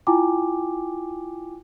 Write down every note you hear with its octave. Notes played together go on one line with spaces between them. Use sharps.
E4 F4 G5 G#5 D6